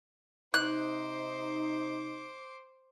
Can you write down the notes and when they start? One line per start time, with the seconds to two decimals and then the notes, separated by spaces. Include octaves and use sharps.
0.54 C3 D#4 C5 D6 F#6